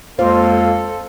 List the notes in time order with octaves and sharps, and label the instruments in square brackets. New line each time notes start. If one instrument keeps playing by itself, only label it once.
[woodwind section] F2 G#3 A#3 [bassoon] F4 [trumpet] A4 [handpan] C5